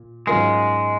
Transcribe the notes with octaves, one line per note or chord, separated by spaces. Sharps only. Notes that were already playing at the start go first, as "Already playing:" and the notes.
Already playing: A#2
G#2 F#3 G#3 C#4 F4 A#4